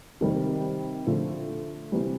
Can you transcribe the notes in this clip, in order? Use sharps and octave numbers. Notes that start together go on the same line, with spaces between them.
C3 D#3 G3
D3 F3 A3
C3 E3 G3